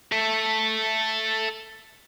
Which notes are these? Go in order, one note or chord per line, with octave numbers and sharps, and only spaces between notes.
A4 E5